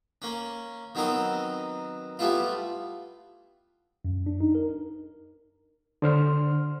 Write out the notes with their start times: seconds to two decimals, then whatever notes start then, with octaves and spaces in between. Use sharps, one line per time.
0.22 A#3 C#4
0.95 D#3 F#3 B3 C4 A#4 D#5
2.19 G3 A3 B3 E4 F4
4.05 F#2
4.26 D4
4.41 D#4
4.55 A#4
6.02 D3 C5 F6